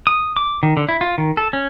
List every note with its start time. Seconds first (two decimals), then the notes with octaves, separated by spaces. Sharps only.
0.07 D#6
0.37 D6
0.63 D#3
0.77 D3
0.89 E4
1.01 F4
1.18 D#3
1.37 A4
1.53 C#4